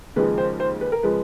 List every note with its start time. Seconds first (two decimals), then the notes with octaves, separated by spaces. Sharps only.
0.16 D#2 C#3 F3 G#3 B4
0.38 C5
0.60 C5
0.81 B4
0.92 A#4
1.03 C#3 F3 G#3 B4